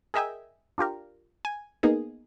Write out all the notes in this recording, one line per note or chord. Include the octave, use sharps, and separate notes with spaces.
G#4 A#4 D#5 E5 G5 G#5
D4 F4 G4 A#4
G#5
A#3 B3 D#4 G#4